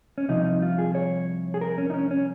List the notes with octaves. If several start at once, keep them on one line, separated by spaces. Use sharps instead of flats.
C#4
C2 C3 F3 D#4
D#4
F4
G#4
C#5
G#4
A#4
C#4
D#4
C#4
C#4